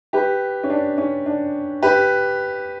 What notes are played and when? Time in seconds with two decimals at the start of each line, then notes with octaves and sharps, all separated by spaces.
0.13 G4 B4
0.63 C#4
0.70 D4
0.98 C#4
1.26 D4
1.83 G4 B4